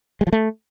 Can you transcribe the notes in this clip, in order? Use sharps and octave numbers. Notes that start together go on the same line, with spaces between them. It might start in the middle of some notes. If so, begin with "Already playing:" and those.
G#3
F3
A3